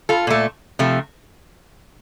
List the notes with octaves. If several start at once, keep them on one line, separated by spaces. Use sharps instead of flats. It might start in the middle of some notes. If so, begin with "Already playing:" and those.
F4 A4
A#2 A3
C3 F3 A3